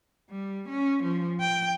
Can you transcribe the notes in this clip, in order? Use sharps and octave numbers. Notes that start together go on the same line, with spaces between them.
G3
C#4
F3
G5